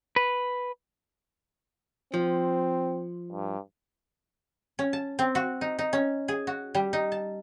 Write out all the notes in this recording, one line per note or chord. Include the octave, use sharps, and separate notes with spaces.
B4
F3 C4
G2
C#4
A5
C4
F#4
D#4
D#4
C#4
G#4
F#4
G3
D#4
A5